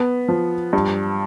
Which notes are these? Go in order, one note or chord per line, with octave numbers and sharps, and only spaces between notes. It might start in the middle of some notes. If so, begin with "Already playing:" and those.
Already playing: B3
F3
G2